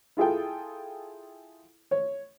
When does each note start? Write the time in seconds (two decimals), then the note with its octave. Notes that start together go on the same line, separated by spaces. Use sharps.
0.17 E4 F4 G#4 A4 G5
1.91 C#5